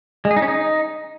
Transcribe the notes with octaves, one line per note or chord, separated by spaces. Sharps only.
G#3
G#4
D#4
C#4
D#4